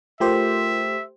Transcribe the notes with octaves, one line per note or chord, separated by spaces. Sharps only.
A3 F4 G4 A#4 C5 E5